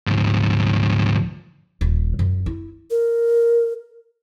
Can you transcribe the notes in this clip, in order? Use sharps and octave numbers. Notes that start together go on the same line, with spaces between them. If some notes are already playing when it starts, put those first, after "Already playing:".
D2 G#2
D#1
F#2
E4
A#4